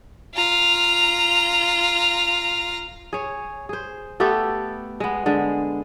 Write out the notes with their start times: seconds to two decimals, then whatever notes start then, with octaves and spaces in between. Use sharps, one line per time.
0.35 F4 A#5
3.13 G#4 C#5
3.69 G#4 C5
4.20 A3 B3 G4 A4
5.00 G#3 B3
5.26 D3 G#3